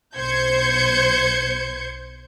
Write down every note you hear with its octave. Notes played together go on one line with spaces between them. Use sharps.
B1 C5 G6 G#6 C#7